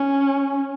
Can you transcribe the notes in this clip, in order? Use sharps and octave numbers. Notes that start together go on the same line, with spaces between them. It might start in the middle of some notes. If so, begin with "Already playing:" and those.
Already playing: C#4